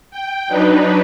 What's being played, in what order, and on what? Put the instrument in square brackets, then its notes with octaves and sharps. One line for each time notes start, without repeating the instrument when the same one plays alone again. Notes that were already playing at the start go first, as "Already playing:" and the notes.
[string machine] G5
F#3 D4 D#4 B4